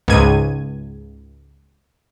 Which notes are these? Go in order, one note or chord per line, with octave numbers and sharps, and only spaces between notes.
C#2 G#2 G#6 D#7